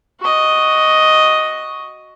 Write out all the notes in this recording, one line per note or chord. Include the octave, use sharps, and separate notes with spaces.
F#4 D#5